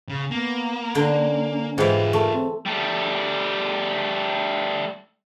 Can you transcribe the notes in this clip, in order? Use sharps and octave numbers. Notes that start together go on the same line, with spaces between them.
C#3
A#3 B3
D3 C#4 G5
G#2 E3 F4 G4 C5
A3 A#4
C4
G3 A3